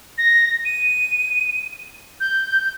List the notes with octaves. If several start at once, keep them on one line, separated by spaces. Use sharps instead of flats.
A#6
D#7
G6